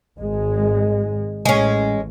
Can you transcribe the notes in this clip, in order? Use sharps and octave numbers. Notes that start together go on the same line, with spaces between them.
G#1 G#3
A1 G#3 C#4